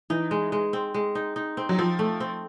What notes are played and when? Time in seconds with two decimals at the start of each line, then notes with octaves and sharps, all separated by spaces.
0.10 E3 D#4
0.31 G#3
0.52 G#3
0.73 C4
0.94 G#3
1.15 D#4
1.36 D#4
1.57 C4
1.69 F#3
1.79 F3 C4
1.99 A3
2.20 C4